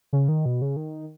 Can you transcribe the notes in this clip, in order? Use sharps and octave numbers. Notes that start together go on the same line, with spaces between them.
C#3
D#3
B2
C#3
D#3